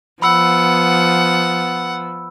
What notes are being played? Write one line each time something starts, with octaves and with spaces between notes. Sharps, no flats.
F3 B3 F#5 B5 E6